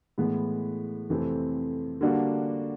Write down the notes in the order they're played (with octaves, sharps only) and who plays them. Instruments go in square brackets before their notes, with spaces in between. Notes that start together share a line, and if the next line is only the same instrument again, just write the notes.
[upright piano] A2 E3 G#3 B3
F2 C3 E3 A3 C4
D3 G3 A#3 D4 F#4